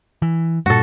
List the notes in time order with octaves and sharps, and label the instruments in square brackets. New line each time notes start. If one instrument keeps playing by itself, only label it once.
[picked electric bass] E3
[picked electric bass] G2 A#2 [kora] F#4 A4